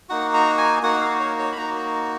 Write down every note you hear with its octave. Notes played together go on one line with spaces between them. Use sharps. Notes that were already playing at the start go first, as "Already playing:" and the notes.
A#3 D#4 F#4 F#5
A#5
G#5
A#3 D#4 F#4 F#5
F5
C#5
C#5
B5
A#3 D#4 F#4 A#5